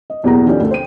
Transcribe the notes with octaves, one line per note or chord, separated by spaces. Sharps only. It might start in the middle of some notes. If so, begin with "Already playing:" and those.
D#5
F#1 E2 B2 G4 G#4 A#5
D#3 F3 C#4 G4 A4 D5
D2 A4
C5 G5 D#7